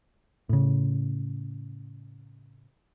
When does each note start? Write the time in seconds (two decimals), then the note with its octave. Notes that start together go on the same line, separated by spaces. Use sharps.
0.49 A2 C#3